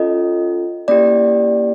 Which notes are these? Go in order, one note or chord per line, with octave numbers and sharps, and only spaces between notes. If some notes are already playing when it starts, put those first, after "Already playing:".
Already playing: C#4 F4 A4 D#5
A#3 C#4 E4 G4 D5